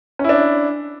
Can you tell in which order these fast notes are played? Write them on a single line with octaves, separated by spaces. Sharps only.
C#4 E4 D4